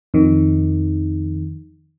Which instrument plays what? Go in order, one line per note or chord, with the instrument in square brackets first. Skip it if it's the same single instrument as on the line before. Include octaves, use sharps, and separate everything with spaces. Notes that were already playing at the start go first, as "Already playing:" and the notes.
[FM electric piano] F2 D#3